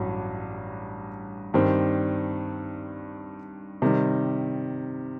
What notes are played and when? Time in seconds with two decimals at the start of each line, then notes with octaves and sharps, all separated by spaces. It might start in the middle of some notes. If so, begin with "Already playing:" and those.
Already playing: A1 G2 F#3
1.54 G2 D#3 G3 C4
3.82 C3 D#3 G3